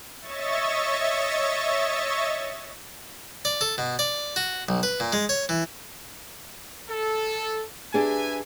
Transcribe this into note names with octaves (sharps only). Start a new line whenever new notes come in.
C#5 D#5 E5 C#6 A6
D5
A4
B2
D5
F#4
B1
B4
A#2
G#3
C#5
E3
A4
D4 G4 G#4 B4 E5 G#5